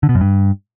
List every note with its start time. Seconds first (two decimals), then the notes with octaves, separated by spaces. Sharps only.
0.03 D3
0.09 B2
0.15 F#2
0.21 G2